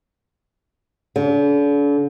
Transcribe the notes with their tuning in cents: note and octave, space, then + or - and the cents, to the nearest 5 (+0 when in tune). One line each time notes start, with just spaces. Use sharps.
D3 -40